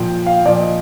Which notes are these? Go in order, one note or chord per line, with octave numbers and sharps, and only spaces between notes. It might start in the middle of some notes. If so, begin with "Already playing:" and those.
Already playing: A#2 F3 G5
F5
A#2 F3 D5
D#5